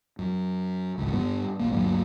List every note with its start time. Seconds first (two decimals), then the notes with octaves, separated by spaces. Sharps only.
0.19 F#2
0.98 G#1 C#2
1.13 G2 G3 B3
1.60 A#1 D#2 A#3
1.72 D2 G2 F#3 A#3